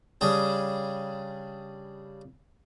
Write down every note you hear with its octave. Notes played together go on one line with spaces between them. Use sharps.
C#3 G3 D4 G#4